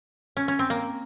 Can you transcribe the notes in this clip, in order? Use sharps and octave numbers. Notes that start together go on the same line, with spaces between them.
C#4
C#4
C4
A#3